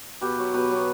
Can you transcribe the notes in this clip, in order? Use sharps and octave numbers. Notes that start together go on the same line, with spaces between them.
B2 G4 B4
F#3 B3
B2 G4 B4
F#3 B3